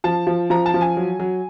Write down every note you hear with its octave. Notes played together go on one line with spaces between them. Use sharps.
F3 A5
F3
F3 A#5
A5
F3
G#5
F#3
F#3